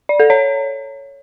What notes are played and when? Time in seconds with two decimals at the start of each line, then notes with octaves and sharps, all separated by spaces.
0.09 D5
0.20 A4
0.30 C#5